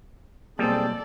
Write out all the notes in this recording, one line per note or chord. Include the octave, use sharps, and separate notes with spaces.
B1 G3 A#3 C4 G#4 A4 D5